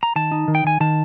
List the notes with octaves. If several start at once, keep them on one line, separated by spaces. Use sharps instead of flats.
A#5
D#3 A5
D#4
D#3
G5
D#3 G#5
D#3 A5